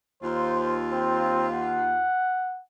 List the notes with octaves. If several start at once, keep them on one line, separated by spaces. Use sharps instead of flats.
D#2 F4 C5
C4
F#5